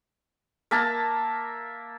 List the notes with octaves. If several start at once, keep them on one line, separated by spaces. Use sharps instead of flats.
A#3 E5 A5 A#5